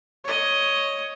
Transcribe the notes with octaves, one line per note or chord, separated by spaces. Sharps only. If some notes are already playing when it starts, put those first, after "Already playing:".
C#5 D#5